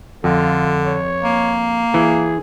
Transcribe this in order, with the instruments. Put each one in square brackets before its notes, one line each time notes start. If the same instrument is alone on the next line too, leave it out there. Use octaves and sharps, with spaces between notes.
[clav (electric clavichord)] F2 [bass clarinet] D3 [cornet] F4
[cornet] C#5
[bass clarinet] A#3
[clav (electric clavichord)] E3 [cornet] G#4